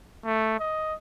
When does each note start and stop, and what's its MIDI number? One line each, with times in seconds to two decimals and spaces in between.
0.25 0.57 57
0.60 0.94 75